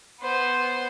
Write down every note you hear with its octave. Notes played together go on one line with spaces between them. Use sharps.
B3 C5